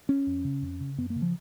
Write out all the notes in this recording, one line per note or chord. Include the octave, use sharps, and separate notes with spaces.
C#4
F2
C#3
F2
C#3
F#2 B3
A#3
C#3
F3